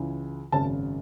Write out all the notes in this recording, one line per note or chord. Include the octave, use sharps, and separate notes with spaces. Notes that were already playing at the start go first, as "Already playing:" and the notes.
Already playing: C#2 C#3 E3
G#1 F#2 C#3 A5